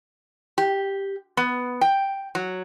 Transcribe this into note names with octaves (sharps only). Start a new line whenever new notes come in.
G4
B3
G5
F#3